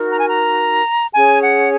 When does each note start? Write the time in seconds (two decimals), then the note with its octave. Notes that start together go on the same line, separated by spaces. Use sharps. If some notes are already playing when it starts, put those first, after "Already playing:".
Already playing: D#4 F#4 A#4
0.11 A#5
0.19 G#5
0.27 A#5
1.14 C#4 G#4 C#5 G#5
1.43 F#5